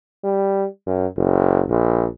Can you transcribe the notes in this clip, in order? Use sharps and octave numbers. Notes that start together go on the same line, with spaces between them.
G3
F#2
F#1
A#1